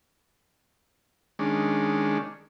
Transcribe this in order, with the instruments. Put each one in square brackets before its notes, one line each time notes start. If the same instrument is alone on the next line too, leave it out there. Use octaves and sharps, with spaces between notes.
[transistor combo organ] D#3 G#3 C#4 D4